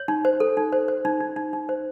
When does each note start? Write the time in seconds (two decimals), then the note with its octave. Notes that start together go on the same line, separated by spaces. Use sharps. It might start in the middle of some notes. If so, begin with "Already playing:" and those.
Already playing: C#5
0.08 D#4
0.25 C5
0.40 A4
0.57 D#4
0.72 C5
0.88 C5
1.05 D#4
1.20 D#4
1.36 D#4
1.53 D#4
1.69 C5